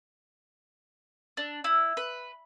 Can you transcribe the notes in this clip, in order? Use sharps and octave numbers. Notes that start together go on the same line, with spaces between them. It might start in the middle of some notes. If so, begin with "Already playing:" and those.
D4
E4
B4